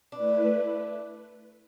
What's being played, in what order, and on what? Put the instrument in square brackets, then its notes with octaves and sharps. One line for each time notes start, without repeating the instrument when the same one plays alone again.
[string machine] A3 E4 B4 [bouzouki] D4